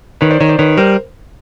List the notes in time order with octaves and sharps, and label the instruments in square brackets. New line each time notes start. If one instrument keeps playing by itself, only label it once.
[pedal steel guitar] D#3 [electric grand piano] B4 C#5
[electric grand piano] C5 D5
[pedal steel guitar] D#3 [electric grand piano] C#5 D#5
[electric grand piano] C5 D5
[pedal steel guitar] D#3 [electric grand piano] B4 C#5
[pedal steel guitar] G3 [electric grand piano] A#4 C5